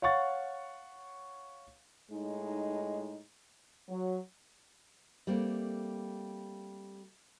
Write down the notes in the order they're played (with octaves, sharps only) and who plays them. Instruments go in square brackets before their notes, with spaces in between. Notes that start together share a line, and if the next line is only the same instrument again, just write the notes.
[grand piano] C#5 F5 F#5 C#6 A6
[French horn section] A2 G#3 D#4
F#3
[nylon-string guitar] G3 A3 A#3 C4